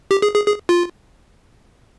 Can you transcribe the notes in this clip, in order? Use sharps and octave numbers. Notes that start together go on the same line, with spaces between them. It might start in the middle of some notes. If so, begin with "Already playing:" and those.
G4
G#4
G#4
G#4
F4